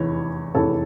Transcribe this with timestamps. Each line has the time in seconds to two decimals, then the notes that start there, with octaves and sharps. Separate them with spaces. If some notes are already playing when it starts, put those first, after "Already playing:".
Already playing: F1 E2 E3 C#5
0.54 F1 E2 E3 A4 C#5